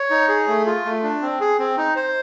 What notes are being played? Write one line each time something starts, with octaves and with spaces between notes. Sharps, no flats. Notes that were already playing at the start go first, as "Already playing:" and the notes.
Already playing: C#5
D#4
G#4
A3
F4
A3
D4
C4
G#4
C4
D#4
C5